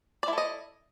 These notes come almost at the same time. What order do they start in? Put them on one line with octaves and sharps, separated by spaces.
D5 E4 A4 D#5